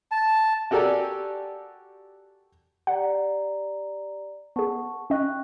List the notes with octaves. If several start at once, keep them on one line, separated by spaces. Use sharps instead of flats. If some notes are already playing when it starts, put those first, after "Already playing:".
A5
F#4 G4 A4 A#4 D5 G#5
G4 D5 F#5 A#5
B3 G#4 F#5 A5 C#6
C#4 D#5 G5 C#6 F#6